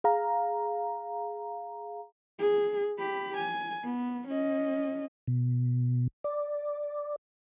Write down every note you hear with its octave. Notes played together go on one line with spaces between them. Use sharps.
G#4 F5 A#5
G#4
G4 B5
G#5
B3
C#4 D#5
B2
D5